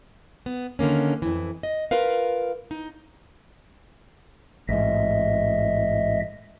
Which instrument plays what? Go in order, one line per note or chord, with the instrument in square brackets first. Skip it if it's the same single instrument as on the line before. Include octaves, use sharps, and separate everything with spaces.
[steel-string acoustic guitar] B3
D3 D#3 A#3 C#4
F2 E3
D#5
F4 A#4 B4 F5
D#4
[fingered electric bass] A1 G#2 [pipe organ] D#5 E5